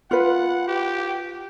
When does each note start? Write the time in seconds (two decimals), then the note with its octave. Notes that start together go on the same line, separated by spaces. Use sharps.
0.11 F4 B4 F#5
0.68 G4